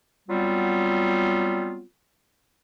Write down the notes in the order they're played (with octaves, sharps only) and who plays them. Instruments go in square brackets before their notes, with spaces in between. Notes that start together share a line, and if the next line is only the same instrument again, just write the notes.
[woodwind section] F#3 G3 B3 C4 F4